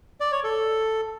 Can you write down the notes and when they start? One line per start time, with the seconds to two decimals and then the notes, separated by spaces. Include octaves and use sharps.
0.20 D5
0.32 C#5
0.44 A4